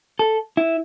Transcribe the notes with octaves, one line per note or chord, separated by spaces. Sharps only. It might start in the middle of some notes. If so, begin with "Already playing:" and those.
A4
E4